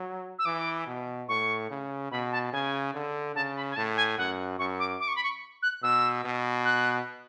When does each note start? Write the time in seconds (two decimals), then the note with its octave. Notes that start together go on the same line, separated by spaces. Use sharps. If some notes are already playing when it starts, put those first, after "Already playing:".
Already playing: F#3
0.39 E6
0.45 E3 D6
0.87 B2
1.29 A2 C#6
1.70 C#3
2.11 B2 B5
2.32 A5
2.52 C#3 G#5
2.94 D3
3.35 C#3 A5
3.56 B5
3.70 G#5
3.76 A2 A5
3.97 G#5
4.18 F#2 F#5
4.58 F#2 C#6
4.79 D6
5.00 D6
5.08 C#6
5.16 B5
5.24 C#6
5.63 F#6
5.83 B2 E6
6.24 B2
6.65 F#6